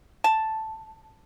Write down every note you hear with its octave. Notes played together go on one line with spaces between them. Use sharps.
A5